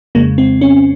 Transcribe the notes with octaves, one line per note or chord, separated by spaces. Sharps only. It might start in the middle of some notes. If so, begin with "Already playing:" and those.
F2 C#3 G#3 A#3
C4
C#4